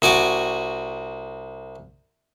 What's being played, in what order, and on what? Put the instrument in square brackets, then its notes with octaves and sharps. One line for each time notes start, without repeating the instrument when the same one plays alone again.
[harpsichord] C2 F#4 G#5 D6